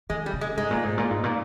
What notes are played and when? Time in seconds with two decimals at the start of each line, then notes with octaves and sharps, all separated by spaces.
0.10 D#3 G#3
0.26 G3
0.33 C#3
0.41 G#3
0.57 G#2 G#3
0.71 A#2
0.84 G#2
0.98 A#2
1.10 G#2
1.24 A#2